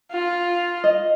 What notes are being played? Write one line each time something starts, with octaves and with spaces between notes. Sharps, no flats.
F4
D#5